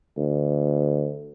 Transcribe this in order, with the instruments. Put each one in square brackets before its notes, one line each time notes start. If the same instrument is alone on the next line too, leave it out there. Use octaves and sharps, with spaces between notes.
[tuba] D2